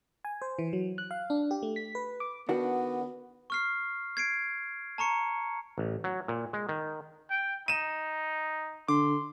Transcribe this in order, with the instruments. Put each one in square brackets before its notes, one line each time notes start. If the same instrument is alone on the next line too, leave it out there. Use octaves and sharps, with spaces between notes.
[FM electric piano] G#5
C5
E3
F#3
F#6
F5
D4
G4
A3
B6
B4
D6
[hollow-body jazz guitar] D#3 D4 F#4 [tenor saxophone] B3
[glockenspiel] C#6 F6 C7
G#6 C7 D7
A5 A#5 C#6 C#7
[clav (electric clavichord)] A1
F#3
A#2
G#3
D#3
[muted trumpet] G5
[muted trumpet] D#4 [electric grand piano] D#7 E7
[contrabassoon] D3 [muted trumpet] C6 [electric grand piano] D6